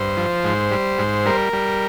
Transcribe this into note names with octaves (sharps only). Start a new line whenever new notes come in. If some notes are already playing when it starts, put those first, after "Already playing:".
Already playing: G2 C5
F3
G#2
G3
G#2
G3 A#4
G3